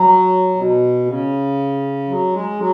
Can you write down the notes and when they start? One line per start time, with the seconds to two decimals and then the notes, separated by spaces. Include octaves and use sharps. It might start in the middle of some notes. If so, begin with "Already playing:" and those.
Already playing: F#3
0.55 B2
1.06 C#3
2.08 F#3
2.33 G#3
2.58 F#3